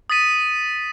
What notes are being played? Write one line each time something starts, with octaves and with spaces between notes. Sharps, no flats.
D#6 A6 B6 D#7